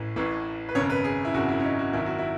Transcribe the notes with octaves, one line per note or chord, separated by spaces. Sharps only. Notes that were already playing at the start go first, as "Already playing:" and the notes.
Already playing: A1 A2 E3
A1 A2 E3
B4
G#1 F#2 C#3 C#5
B4
G#4
E4
G#1 F#2 C#3 F#4
E4
C#4
D#4
F#4
G#1 F#2 D#3 E4
F#4
E4